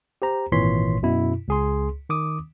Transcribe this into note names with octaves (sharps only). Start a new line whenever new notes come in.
G4 C5 A#5
G#1 A#2 E3 C#5 C6 B6
F#2 B2 E4
C#2 G#4 C6
D#3 D6 D#6